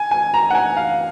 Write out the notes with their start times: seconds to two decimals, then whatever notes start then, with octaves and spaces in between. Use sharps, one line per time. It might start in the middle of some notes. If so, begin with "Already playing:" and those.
Already playing: G#5
0.11 G#5
0.34 A#5
0.50 F#5
0.55 G#5
0.77 F5